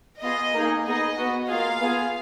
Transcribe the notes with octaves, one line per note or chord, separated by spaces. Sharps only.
B3 F4 G#4 D#5
A#3 D#4 G#4
B3 D#4 G#4 D#5
B3 F#4
A#3 F4 G#4 F5
B3 F4 G#4